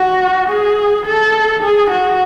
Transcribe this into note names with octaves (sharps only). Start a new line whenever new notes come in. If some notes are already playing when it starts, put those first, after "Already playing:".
Already playing: F#4
G#4
A4
G#4
F#4